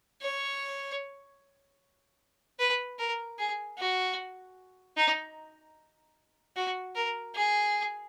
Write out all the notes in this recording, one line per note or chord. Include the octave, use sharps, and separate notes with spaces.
C#5
B4
A#4
G#4
F#4
D#4
F#4
A#4
G#4